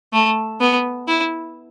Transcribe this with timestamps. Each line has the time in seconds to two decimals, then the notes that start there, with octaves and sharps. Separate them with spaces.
0.13 A3
0.60 B3
1.08 E4